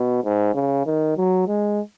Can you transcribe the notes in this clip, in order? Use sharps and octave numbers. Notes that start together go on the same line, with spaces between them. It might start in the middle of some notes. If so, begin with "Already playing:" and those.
Already playing: B2
G#2
C#3
D#3
F#3
G#3